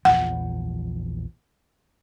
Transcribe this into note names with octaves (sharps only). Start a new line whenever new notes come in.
A#1 E2 F3 F#5